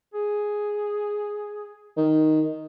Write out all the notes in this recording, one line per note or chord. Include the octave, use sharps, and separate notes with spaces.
G#4
D#3